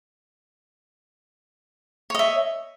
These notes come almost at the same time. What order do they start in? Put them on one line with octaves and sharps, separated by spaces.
C#5 D#5 E5